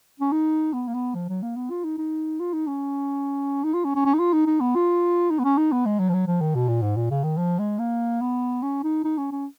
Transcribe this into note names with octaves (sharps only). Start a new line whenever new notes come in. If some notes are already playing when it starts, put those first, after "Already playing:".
C#4
D#4
B3
A#3
B3
F3
F#3
A#3
B3
F4
D#4
D#4
F4
D#4
C#4
D#4
F4
C#4
C#4
C#4
D#4
F4
D#4
D#4
B3
F4
D#4
B3
C#4
D#4
B3
G#3
F#3
F3
F#3
F3
D#3
B2
A#2
G#2
A#2
C#3
D#3
F3
G#3
A#3
B3
C#4
D#4
D#4
C#4
C#4